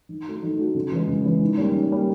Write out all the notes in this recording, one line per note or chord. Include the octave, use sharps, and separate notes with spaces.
D#3
F#3 A3
D#3
F#3 A3
C#3
E3 G#3
C#3
E3 G#3
D#3
G3 A#3 C#4
D#3
G3 A#3 C#4